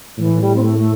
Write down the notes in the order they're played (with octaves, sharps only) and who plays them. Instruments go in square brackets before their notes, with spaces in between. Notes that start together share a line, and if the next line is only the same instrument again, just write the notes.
[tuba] A2 [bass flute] E3
[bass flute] G3
C4
A3
A3